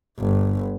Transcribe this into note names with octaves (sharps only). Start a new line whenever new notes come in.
G1